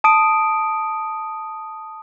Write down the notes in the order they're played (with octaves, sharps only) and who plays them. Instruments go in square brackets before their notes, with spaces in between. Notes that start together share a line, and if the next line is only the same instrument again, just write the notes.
[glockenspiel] A5 D#6 D7